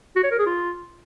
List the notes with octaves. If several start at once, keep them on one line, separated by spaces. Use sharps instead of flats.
F#4
C#5
A#4
G#4
F4